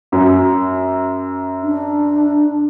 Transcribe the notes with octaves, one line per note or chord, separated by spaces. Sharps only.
F#2
D4